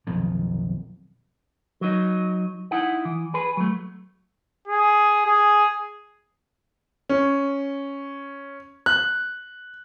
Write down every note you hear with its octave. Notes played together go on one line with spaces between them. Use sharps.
B1 F2 D#3 F3
F#3 D#4
D#4 E4 F#5
E3
G#4 B4
F#3 A3
G#4
G#4
C#4
F#6